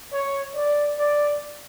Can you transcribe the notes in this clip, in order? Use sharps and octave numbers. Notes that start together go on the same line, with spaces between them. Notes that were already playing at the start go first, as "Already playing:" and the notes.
C#5
D5
D5